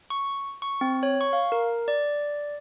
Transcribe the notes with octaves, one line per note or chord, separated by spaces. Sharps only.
C#6
C#6
C4
C#5
C#6
F5
A#4
D5